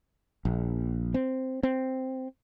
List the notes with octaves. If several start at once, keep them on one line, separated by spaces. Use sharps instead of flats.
A#1
C4
C4